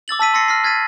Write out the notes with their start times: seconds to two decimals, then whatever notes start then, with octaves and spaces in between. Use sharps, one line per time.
0.08 D6 E6 A6 F#7
0.19 A5 E6 B6 D#7
0.34 C6 E6 A6 A#6 C7 C#7
0.48 F6 A#6 C7
0.64 F6 G#6 A6 B6 D#7